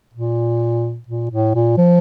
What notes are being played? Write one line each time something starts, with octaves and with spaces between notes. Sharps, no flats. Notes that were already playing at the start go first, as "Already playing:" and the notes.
A#2
A#2
A2
A#2
F3